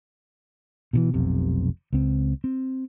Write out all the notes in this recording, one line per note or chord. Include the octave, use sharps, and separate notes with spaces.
B2 D3 E3
F1 B1 C3
C#2 C4
C4